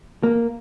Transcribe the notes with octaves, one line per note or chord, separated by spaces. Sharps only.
A#3